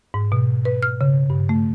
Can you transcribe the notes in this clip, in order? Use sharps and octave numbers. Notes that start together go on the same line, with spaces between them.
G#2
B2
B4
F6
C#3
G2
A3